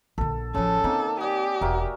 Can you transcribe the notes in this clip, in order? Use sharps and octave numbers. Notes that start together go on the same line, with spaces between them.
A#1 D3 A4
A1 C#3 F3 A4
D#3 A#3 C4
G4 G#4 D5
E1 F#4 A#4 E5